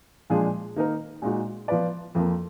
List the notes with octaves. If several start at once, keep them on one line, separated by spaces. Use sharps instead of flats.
A#2 F3 G#3 D4 G#4
D#3 A#3 D#4 A#4
A#2 G#3 D#4 F#4
F3 B3 F4 B4 D5
F2 F3 A#3